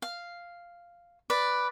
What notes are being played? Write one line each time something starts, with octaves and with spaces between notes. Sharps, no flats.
F5
B4 D5